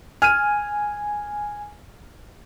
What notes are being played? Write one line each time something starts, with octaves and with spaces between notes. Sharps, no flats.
G#5 F6 D#7